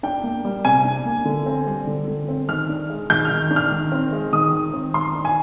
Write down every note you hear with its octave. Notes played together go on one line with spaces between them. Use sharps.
D4 G5
A#3
G3
C3 G#5
D4
A#3
D3
C4
G3
D3
D3
C4
D#3 F6
D4
G#3
D#3 G6
F6
D#3
D4
F6
D#3
C4
G#3
D#3 D#6
D#3
C4
D#3 C6
D4
G#5